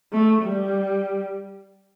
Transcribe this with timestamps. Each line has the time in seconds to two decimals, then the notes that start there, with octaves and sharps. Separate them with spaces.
0.13 A3
0.42 G3